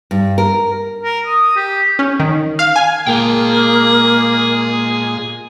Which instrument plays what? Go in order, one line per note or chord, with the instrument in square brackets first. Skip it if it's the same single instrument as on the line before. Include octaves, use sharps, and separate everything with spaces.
[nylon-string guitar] G2
A#4
[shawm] A#4
D#6
G4
[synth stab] C#4
D#3
F5
G#5
[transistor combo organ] A#2 G#3 [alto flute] A#3 [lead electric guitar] G#4 G5